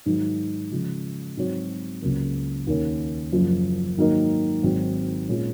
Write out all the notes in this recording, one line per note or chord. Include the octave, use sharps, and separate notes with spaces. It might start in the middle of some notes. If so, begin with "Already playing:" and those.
G#2 D#3 F#3
C#3 F3 G#3
G#2 F#3 C4 F#4 C#5
C#2 C#3 F#3 A#3
D#2 D#3 A#3 C#4
F#1 F#2 F3
G#2 D#3 F#3 A#3 D#4
G#1 G#2 F#3 C4 F#4
A#2 G#3 C#4 F4